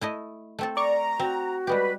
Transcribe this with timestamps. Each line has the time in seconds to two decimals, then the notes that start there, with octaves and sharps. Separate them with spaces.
0.01 A3 E4 D#5
0.59 A3 C4 A4
0.77 D5 A#5 C#6 D6
1.20 C4 F#4
1.67 G3 G#3 G4 B4